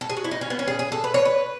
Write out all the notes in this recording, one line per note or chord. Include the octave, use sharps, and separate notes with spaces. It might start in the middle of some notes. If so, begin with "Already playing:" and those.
A4
G#4
F#4
E4
D#4
C#4
B3
C#4
G#4
G#4
A4
B4
C#5
B4